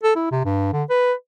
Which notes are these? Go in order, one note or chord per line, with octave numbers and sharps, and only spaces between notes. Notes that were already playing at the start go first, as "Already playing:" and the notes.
A4
E4
C3
G2
D3
B4